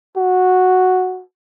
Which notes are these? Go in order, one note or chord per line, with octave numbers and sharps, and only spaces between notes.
F#4